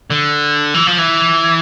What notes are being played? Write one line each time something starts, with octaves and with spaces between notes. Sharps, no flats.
D3
E3
F3
E3